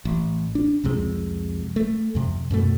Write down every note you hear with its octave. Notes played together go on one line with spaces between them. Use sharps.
A1
D4
C2 F2 C3 G#3
A3
F2 C3
F#2 B2 A3